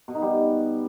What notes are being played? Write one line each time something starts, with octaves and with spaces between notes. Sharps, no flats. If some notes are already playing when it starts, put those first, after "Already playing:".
B2
D#4
G3